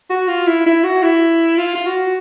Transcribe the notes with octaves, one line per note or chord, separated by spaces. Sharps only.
F#4
F4
E4
E4
F#4
E4
F4
F4
F#4